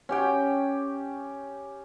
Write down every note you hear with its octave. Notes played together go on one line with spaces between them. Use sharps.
C#4 G4 G5